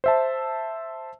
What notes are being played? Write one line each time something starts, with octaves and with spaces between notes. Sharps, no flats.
C5 E5 A5